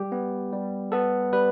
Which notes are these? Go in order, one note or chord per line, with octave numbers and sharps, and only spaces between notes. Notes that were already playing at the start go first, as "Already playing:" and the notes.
Already playing: G3 G4
B3
G3
B3 A4
G3 B4